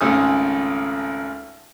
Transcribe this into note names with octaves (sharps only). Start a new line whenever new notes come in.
G#1 C#2 A3 A4 G#5 D#6